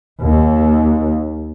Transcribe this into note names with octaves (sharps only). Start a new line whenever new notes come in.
D#2